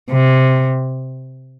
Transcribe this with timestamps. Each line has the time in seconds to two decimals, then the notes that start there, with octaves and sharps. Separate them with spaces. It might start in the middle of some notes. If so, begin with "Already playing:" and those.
0.11 C3